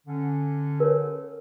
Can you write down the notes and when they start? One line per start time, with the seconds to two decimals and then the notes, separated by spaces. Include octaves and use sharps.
0.07 D3 C#4
0.80 A#4 C#5